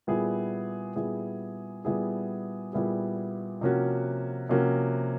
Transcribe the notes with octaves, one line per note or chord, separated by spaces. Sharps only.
A#2 G3 B3 E4 G#4
A#2 G3 B3 E4 G#4
A#2 G3 B3 E4 G#4
A#2 G3 B3 E4 G#4
C3 F3 A#3 C#4 F#4
C3 F3 A#3 C#4 F#4